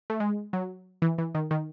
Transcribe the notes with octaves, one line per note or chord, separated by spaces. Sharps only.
A3
G#3
F#3
E3
E3
D#3
D#3